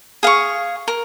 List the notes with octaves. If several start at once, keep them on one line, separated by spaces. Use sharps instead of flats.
G#4 F5 C#6
A#4